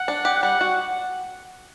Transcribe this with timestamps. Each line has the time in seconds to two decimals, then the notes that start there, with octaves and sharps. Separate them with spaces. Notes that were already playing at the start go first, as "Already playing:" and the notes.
Already playing: F#5
0.08 D4
0.25 G4
0.43 G3 F#5
0.61 F#4